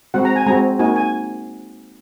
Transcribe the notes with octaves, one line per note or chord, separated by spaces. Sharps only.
G#3 C4 F#4 F#5
A#5
G#5
G#3 C4 F#4 A#5
A#3 D#4 F#4 G#5
G#5